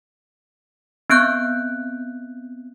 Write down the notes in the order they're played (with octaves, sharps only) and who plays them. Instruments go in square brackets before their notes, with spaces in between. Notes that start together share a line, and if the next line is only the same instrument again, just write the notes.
[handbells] B3 C4 F#6 G6